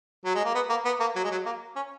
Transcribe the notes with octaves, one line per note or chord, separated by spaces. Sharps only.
F#3
G#3
A#3
B3
A#3
B3
A#3
F#3
G#3
F#3
A#3
C#4